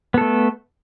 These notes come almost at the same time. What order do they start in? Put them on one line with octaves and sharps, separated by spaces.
B3 A4 A3